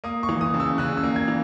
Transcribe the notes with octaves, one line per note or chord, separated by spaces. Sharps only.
A#3 D#6
C#6
E3
D#6
C#3
E6
C#3 F#6
E6
A#3
G#6
E3